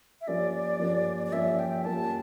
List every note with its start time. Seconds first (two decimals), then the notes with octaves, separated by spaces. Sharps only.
0.21 E5
0.27 F3 A#3 C#4 G4 D5
0.79 F3 A#3 C#4 G4
1.27 D5
1.32 F3 A#3 C#4 G4 E5
1.59 G5
1.84 F3 A#3 C#4 G4 A5